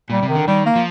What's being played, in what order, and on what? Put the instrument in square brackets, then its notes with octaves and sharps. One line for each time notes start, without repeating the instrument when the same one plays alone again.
[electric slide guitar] A#2 [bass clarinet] G3
[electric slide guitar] C3
[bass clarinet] D#3
[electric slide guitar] D3
[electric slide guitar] D#3 [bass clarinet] G3
[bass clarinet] A#3
[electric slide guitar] F3